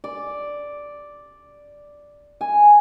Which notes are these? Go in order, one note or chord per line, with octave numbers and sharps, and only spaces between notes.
D5
G#5